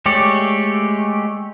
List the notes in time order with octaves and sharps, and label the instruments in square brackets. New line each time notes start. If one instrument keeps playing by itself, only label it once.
[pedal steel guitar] G#3 A3 G4 C#5 D5